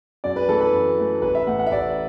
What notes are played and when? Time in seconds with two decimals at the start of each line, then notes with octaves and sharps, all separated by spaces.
0.24 F#2 D5
0.36 B4
0.48 E3 A3 A4
0.60 B4
0.73 F#2
0.98 E3 A3
1.22 A1 B4
1.35 E5
1.47 A2 A3 F#5
1.59 F#5
1.67 E5
1.72 A1 D5